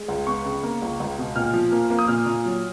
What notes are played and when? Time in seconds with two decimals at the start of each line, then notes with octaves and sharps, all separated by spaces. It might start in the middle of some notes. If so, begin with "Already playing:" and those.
Already playing: G#3
0.08 C#2
0.27 B3 C#6
0.46 C#3
0.63 A#3
0.82 C#2
1.00 C#2
1.18 B2
1.36 A#2 F6
1.53 F3
1.72 A#3
1.90 A#3
1.99 D#6
2.08 A#2 F6
2.26 A#2
2.45 F#3